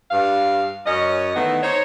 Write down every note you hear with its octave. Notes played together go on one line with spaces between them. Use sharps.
G2 F5
F#2 C#4 C#5 D#5
D#3 E3 A3 B3 D#4
D#4 C5 C#5